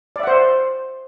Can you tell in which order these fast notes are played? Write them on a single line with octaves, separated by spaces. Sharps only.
D5 E5 F#5 C5